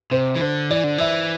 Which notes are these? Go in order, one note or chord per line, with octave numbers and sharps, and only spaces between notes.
C3 C5
E3
D3 C5
E3 D5
D3
E3 E5